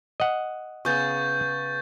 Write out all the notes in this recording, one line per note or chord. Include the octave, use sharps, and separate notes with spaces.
D#5 F#5
C#3 B3 C#6 G6 A6